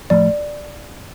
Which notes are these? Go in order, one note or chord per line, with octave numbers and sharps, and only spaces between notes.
A2 F3 A3 D5